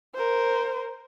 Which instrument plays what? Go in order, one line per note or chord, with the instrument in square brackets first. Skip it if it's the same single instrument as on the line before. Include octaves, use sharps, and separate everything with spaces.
[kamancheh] A#4 C5